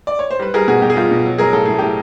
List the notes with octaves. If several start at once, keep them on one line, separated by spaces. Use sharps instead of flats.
D5
C#5
C5
G3 B4
G3 G#4 A#4
B2 F#4 G#4
B2 G4
G#4
G3 F4 G4
B2
F#3
F#3 G#4 A#4
A2 A4
A2 G#4
A2 G4